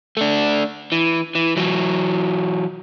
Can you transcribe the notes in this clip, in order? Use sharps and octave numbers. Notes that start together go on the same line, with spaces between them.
A3 D4
E3
E3
E3 F#3